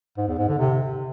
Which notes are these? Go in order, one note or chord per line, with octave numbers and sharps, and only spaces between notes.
G#2
E2
G#2
D3
C3